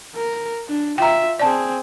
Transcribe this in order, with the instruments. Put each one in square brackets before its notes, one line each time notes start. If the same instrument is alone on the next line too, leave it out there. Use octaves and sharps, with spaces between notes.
[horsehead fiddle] A#4
D4
[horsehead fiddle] F4 E5 [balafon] G5 A#5
[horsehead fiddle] C4 G#4 [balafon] D5 A5